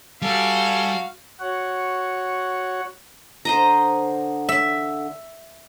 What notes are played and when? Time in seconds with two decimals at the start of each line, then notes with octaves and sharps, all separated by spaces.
0.22 G3 F#4 A4 F5 G#5
1.40 F#4 C#5 F#5
3.45 D3 C5 D#5 A#5
4.49 E5